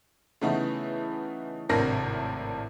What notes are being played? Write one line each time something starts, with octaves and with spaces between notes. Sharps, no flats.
C#3 E3 A3 B3 D#4 E4
G#1 A2 C3 D4 A#4 A#6